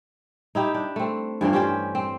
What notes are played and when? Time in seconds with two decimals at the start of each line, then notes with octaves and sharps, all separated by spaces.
0.55 D#4 E4 G4
0.74 D4
0.96 A3 C4
1.41 G2 E3 F3 D5
1.53 C#4 G4 C5 D5
1.95 C4